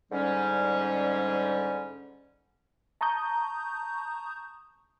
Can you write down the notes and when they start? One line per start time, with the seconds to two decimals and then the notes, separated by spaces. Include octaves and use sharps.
0.10 G#2 D3 G3 C#4
3.01 A5 A#5 C#6 D#6 G6